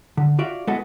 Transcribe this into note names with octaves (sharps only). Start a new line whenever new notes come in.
D3
F4 F#4 D5 E5 F5
G#3 B3 E4 F#4 A4